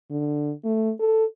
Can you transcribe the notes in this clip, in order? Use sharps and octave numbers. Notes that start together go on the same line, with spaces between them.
D3
A3
A4